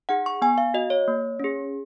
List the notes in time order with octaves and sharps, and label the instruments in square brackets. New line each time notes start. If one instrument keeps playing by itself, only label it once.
[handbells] D#4 G#4 F#5
C#6
B3 G#5
F5
F#4 D#5
C#5
A#3
C#4 G#4